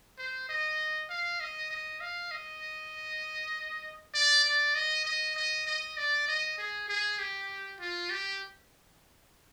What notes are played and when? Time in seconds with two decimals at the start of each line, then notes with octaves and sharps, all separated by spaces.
0.18 C5
0.49 D#5
1.09 F5
1.40 D#5
1.71 D#5
2.01 F5
2.31 D#5
4.14 D5
4.45 D5
4.75 D#5
5.05 D#5
5.36 D#5
5.67 D#5
5.98 D5
6.28 D#5
6.58 G#4
6.89 G#4
7.19 G4
7.80 F4
8.10 G4